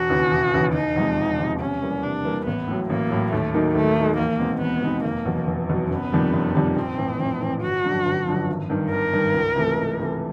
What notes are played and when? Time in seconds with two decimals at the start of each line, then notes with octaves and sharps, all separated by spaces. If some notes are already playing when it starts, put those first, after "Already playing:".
Already playing: E1 F#4
0.10 D#2 C#3 E3
0.31 E1
0.53 D#2 C#3 E3
0.74 E1 D#4
0.96 E2 C3 F3 G#3
1.17 E1
1.39 E2 C3 F3 G#3
1.60 C3 C#4
1.82 E3 G3 A#3
2.03 C3 D4
2.25 E3 G3 A#3
2.46 A1 B3
2.68 A2 F#3
2.89 A1 A#3
3.10 A2 F#3
3.32 D#2 A3
3.54 D#3 F#3 A#3 D#4
3.75 D#2 A3
3.96 D#3 F#3 A#3 D#4
4.18 E2 A#3
4.39 B2 G#3 C4 D#4
4.61 E2 B3
4.83 B2 G#3 C4 D#4
5.04 F1 A#3
5.26 E2 B2 F#3
5.47 F1
5.69 E2 B2 F#3
5.90 F#1 B3
6.12 F2 C3 D#3 G3
6.33 F#1
6.55 F2 C3 D#3 G3
6.76 A#1 C4
6.98 A2 E3
7.20 A#1
7.41 A2 E3
7.62 G1 F#4
7.84 F#2 D3 F3
8.05 G1
8.27 F#2 D3 F3
8.48 G#1
8.70 G2 D#3
8.91 G#1 A#4
9.13 G2 D#3
9.34 C#2
9.56 C3 E3 A3
9.77 C#2
9.99 C3 E3 A3